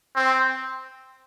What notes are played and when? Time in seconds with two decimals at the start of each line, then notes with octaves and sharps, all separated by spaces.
0.16 C4